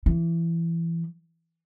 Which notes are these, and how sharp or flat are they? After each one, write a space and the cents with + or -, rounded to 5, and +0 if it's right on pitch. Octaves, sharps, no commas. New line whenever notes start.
E3 +20